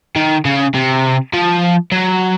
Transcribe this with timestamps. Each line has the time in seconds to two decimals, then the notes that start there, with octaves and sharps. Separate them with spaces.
0.16 D#3
0.45 C#3
0.74 C3
1.33 F3
1.92 F#3